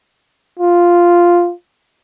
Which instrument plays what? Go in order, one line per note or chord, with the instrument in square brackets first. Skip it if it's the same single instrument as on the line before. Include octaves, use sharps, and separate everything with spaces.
[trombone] F4